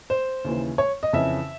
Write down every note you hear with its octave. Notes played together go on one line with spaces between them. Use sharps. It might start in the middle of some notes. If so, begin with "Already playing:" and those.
C5
D#2 C#3 E3
C#5
D#5
F2 C#3 E3 E5